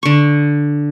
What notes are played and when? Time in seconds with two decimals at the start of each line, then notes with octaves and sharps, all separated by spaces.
0.03 D3 C#6